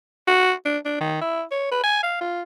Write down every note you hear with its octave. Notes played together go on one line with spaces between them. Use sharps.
F#4
D4
D4
D#3
E4
C#5
B4
G#5
F5
F4